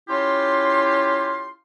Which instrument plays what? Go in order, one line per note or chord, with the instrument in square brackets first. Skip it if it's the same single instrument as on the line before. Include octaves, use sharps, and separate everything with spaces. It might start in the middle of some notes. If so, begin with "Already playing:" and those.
[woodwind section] C#4 E4 F4 G4 C6